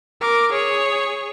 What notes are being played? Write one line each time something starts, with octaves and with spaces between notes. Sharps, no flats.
A#4 D6
G#4 C#5